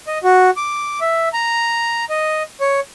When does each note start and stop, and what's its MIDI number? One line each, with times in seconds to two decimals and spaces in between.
0.07 0.18 75
0.24 0.50 66
0.57 1.00 86
1.01 1.29 76
1.33 2.05 82
2.10 2.43 75
2.60 2.80 73